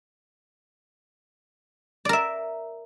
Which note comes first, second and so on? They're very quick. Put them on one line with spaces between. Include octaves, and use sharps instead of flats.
D5 A#4 E5